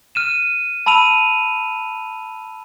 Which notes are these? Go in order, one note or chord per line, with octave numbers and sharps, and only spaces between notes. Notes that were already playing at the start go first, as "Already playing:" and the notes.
F6 D#7 E7
A5 B5 E6 D#7 F7